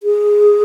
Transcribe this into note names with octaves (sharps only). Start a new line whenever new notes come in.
G#4